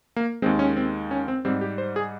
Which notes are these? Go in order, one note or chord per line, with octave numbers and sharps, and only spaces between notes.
A#3
D#2 D#3 G#3 C4
C#4
C4
C#4
C4
G#2 G3 C4
G4
C5
G#4